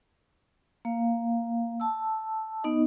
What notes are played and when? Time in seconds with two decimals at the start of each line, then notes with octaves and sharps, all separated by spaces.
0.85 A#3 F5
1.80 A5 E6
2.64 B3 D#4 D#5